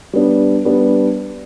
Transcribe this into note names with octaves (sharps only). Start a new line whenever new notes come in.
G3 B3 D4
G3 B3 D4